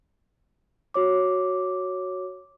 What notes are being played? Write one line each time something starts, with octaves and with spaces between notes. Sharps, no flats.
F#4 C#5 D6